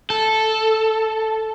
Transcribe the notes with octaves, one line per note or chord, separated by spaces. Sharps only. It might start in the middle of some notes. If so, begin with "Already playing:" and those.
A4